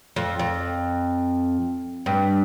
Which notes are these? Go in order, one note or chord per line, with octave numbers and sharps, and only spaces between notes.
F2
F2
G2